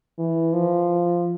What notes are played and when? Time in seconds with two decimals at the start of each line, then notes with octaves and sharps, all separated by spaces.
0.19 E3
0.53 F3